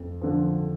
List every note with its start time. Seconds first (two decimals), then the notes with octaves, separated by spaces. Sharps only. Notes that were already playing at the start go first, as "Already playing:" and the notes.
Already playing: F2
0.21 D3 F3